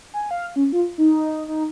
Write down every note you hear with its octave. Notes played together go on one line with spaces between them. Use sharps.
G#5
F5
C#4
F4
D#4
D#4